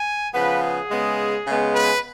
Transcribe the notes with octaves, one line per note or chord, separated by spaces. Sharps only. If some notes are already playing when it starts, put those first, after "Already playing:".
Already playing: G#5
C#3 F3 B3 B4
G#4
C#3 G#3 B3
C#3 G#3 B3
B4